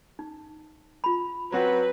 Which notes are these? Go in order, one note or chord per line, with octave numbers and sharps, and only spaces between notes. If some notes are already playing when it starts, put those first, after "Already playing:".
D#4
F4 B5
F#3 C4 F#4 B4